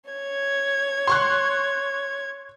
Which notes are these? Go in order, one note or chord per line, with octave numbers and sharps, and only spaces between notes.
C#5 G#6
C6 C#6 F#6